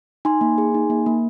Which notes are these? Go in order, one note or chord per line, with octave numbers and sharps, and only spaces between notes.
D#4 G#5 C6
A#3
G#4
D#4
A#3
A#3